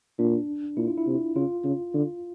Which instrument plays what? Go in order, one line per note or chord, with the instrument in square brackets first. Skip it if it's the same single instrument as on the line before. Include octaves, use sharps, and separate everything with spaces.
[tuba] A#2 [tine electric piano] D4
[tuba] A#2 [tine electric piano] E4
[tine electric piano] F4
E4
[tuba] C3
[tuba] C#3 [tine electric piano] F4
[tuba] C#3
D3